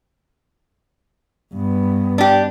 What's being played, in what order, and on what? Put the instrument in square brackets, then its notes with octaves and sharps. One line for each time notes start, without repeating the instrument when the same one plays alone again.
[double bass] G2 B3
[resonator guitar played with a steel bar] D4 G4